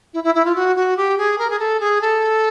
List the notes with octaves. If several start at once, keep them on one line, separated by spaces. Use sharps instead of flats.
E4
E4
E4
F4
F#4
F#4
G4
G#4
A#4
G#4
A4
G#4
A4